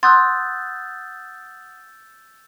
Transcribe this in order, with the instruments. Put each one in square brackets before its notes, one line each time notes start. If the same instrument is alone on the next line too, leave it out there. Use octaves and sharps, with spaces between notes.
[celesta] F#5 D#6 F#6 [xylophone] C6 [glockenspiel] E6 G6 A6